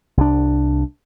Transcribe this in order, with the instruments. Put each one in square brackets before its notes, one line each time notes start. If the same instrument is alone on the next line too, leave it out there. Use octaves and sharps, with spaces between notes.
[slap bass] C2 D4